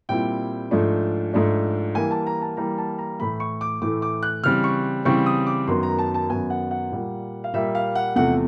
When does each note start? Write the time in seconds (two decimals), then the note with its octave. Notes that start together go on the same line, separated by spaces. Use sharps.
0.09 A#2 G3 C4 E4 G5
0.71 G#2 F3 A3 D4
1.33 G#2 F3 A3 D4
1.95 E3 G3 A#3 G#5
2.11 A5
2.27 A#5
2.42 A5
2.57 E3 G3 A#3 A#5
2.78 A5
2.99 A#5
3.19 A2 E3 A3 B5
3.40 C#6
3.61 D6
3.82 A2 E3 A3 D6
4.02 D6
4.23 F#6
4.44 C#3 E3 G3 C4 F6
4.64 C#6
5.05 C#3 E3 G3 C4 C#6
5.26 D#6
5.47 D6
5.67 F#2 D#3 F#3 B3 C6
5.83 A#5
5.99 A5
6.14 A5
6.29 F#2 D#3 F#3 B3 G#5
6.50 F#5
6.71 F#5
6.92 A#2 G3 A#3
7.44 F5
7.53 A#2 G3 A#3 E5
7.75 F5
7.95 F#5
8.16 E2 C3 F3 A3 F#5